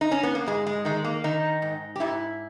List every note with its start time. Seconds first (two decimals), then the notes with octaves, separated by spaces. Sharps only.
0.01 D#4
0.11 C#4
0.23 B3
0.35 A#3
0.46 G#2 G#3
0.66 G#3
0.85 D#3 G#3
1.04 A#3
1.24 D#3 D#4
1.62 G#2
1.96 G4
2.00 G#2 E4